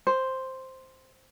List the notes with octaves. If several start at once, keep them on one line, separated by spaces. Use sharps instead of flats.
C5